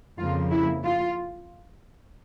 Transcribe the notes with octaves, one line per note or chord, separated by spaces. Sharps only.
F2 C#3 F3 A#3 F4
E4
F4